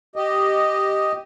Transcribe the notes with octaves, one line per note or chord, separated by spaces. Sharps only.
G4 D#5